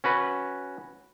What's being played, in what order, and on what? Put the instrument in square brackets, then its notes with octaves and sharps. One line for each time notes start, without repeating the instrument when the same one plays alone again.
[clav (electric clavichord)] C#4 F#4 B4